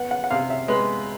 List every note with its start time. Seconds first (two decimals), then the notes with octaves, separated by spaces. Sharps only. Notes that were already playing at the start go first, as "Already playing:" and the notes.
Already playing: B3 F#5
0.11 F#5
0.24 F#5
0.30 C3 F5
0.50 E5
0.68 G#3 B4